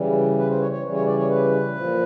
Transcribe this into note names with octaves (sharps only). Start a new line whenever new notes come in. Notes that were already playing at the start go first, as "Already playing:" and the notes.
Already playing: C#3 E3 G3
B4
C5
C#5
C#5
C#3 E3 G3
C#5
D5
C#5
B4
A#2 F3